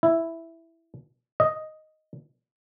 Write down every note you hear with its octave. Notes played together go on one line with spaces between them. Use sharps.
E4
D#5